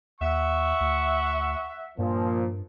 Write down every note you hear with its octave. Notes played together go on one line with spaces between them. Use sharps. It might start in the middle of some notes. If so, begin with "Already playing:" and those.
D#2 E5 F#5 C#6
D2
G2 A#2 F3